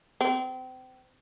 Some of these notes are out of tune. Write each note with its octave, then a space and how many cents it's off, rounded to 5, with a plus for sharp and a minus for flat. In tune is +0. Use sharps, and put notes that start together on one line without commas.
C4 -30